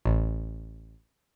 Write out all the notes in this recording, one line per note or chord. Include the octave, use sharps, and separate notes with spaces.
A1